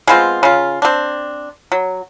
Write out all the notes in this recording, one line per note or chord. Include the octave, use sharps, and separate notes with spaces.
G#3 B3 C4 F4
C#3 F4
C4 D4
F#3